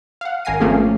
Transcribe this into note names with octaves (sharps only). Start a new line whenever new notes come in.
F5 F#5
G#1 A#4 G#5 A#6 C7 D#7
F3 A3 A#3 C4 C#4 G#4